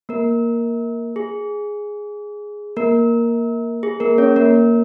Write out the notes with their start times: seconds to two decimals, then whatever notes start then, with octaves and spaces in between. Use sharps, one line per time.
0.09 A#3 A#4
1.16 G#4
2.76 A#3 A#4
3.83 G#4
4.00 A#3 A#4
4.18 C#4 C#5
4.36 A#3 A#4